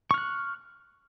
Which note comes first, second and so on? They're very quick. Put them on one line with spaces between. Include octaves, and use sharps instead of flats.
C#6 F6 F#6